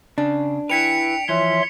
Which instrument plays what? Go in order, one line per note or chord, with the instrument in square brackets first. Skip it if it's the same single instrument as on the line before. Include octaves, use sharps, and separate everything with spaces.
[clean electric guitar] C#3 [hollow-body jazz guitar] D4
[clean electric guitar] E4 B4 [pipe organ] G5 [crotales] B6 C#7 F7
[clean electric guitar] E3 F3 [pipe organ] C#5 E5 C6